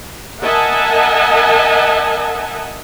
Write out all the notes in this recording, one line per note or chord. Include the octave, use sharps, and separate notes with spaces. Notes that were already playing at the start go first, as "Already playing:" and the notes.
A#4 D#5 E5 F#5 G#5 A5